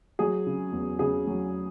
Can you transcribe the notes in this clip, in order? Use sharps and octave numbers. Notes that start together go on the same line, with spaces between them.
F#3 G#4
C#3
E2
C#3 G#4
F#3